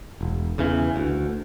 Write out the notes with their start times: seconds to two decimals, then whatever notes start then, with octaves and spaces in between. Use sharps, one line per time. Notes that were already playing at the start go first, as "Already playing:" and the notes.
0.21 E1
0.58 E2 C#3 E3
0.96 D2